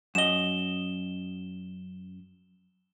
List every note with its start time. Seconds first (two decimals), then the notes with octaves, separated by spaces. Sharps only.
0.15 F#2 D#5 E7 G7